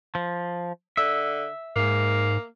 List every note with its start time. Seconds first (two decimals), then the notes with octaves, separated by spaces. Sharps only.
0.15 F3
0.97 D3 E5
1.76 G#2 A#3